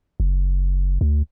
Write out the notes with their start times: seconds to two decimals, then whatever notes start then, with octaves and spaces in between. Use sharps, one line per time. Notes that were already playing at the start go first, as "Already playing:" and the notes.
0.20 F#1
1.01 D2